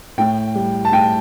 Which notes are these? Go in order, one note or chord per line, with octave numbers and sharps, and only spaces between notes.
A2 G5
G3
A5
A2 G5